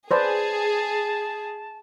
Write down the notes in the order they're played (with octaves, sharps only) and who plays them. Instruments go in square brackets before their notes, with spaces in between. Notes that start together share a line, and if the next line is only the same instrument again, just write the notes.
[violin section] G#4 [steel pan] B4 C5 D5 [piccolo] A5